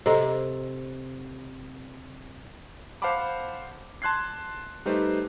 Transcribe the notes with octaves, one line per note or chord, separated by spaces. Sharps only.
C3 A4 D#5 A#5
C5 F5 F#5 A5 B5 D6
A5 C6 F#6 G#6 C7
G3 A3 D#4 G4 B4 C5